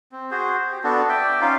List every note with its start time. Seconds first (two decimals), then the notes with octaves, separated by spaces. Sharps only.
0.12 C4
0.31 F#4 G#4 C5
0.72 G4
0.84 B3 D4 F#4 A4
1.09 D5 E5 G5
1.41 C#4 D#4 F4 F5